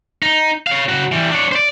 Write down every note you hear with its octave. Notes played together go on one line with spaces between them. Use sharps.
D#4
C#5 F5
C#3 F#4
E3 G3
D4 C#5
C5 D5